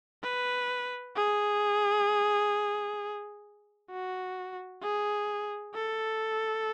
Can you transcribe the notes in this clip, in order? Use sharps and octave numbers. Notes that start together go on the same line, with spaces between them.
B4
G#4
F#4
G#4
A4